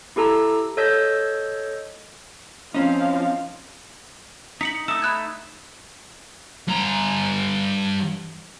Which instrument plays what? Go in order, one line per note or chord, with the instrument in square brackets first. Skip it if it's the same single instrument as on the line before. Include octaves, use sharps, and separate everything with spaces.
[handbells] E4 G4 A4 A#5 E6
A4 C#5 D#5 E6 G6 B6
[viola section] F3 F5 [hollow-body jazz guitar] C4 C#4 D#4
[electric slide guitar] D#4 [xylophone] B6 C#7 F#7
[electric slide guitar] A3 D#4 E5 [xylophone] D#6 E6
[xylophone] B5 F#6 G#6
[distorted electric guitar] G2 A#5